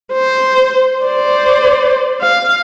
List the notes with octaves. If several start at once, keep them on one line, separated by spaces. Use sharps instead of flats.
C5
C5 D5
F5